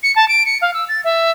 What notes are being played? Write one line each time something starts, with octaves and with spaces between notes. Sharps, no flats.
C#7
A5
D7
C#7
F5
E6
A6
E5